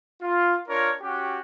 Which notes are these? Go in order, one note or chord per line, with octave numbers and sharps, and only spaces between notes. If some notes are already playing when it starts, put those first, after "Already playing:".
F4
D4 F4 A#4 C#5
C#4 F#4 G4